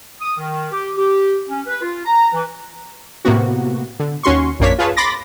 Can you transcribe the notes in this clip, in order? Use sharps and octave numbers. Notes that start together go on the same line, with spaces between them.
D#6
D#3
G4
G4
C#4
B4
F4
A#5
E3
A2 C3 A#3 B3 F#4
D3
D#2 C#4 F#4 C6 C#6
A#1 F#2 A#3 D4 C#5 B6
F4 G#4 B4 C#5 A5
B5 C6 D6 A6 A#6